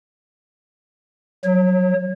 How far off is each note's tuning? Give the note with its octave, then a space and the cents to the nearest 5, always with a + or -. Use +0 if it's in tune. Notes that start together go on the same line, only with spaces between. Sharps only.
F#3 +0 C#5 -35